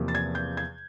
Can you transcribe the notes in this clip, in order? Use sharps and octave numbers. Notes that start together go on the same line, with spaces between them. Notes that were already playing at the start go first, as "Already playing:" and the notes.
Already playing: E2 C3 F3 A#3
A6
G#6
G6
G#6